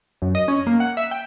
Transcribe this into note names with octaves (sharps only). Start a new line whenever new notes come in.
F#2
D#5
C#4
A#3
F#5
E5
G5